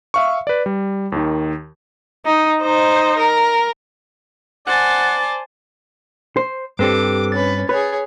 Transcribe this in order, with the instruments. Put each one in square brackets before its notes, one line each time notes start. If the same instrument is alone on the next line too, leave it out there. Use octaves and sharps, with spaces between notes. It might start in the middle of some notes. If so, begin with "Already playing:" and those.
[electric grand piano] E5 F5 C#6
B4 D5
G3
D#2 D#3
[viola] D#4
D#4 C5
A#4
[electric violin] C5 A6 [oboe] D5 [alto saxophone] F#5 [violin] G#5 A5
[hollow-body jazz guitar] C5
[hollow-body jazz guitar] G2 C4 [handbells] G4 A4 B4 [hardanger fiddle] D6
[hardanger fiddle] C#4 B4 [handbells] A6
[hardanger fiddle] G#4 C#5 [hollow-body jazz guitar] B4